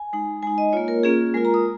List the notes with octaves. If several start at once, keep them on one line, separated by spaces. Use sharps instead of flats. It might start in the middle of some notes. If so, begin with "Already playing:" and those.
Already playing: G#5
G#3 D#4
G#3 D#4 G#5
D#5
A#3 F4 C#5
A#4
A#3 C#4 F4 G#4
G#3 F4 A#4
A#5
D#6